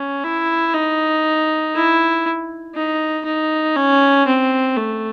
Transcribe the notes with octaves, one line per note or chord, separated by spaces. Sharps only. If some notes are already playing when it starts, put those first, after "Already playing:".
Already playing: C#4
E4
D#4
E4
D#4
D#4
C#4
C4
A3